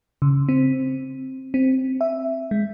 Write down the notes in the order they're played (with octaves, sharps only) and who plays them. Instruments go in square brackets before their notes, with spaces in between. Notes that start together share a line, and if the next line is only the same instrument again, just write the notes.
[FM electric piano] C#3
C4
C4
E5
G#3